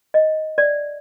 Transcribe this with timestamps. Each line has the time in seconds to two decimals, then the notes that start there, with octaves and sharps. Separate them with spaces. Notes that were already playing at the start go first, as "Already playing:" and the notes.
0.14 D#5
0.58 D5